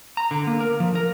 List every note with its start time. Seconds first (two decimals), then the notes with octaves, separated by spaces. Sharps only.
0.17 A#5
0.31 D3
0.47 A#3
0.60 A#4
0.80 F3
0.95 A#4